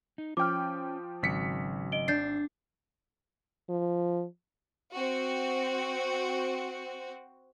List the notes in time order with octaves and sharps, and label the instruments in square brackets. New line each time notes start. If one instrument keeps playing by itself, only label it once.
[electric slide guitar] D#4
[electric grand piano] F3 G5 [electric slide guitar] C#4 [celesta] D6 F6
[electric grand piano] G#1 B6 C#7 [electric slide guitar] C#3 F#3
[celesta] D#5 D7 G7
[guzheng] D4 [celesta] G6 A6 C7
[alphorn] F3
[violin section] C4 F#4